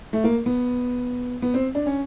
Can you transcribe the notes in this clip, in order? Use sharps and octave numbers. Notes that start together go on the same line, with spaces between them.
A3
A#3
B3
B3
C4
D4
C#4